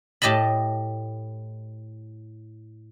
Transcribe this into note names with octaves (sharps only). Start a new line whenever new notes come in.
A2 G4 D#5 A5 B5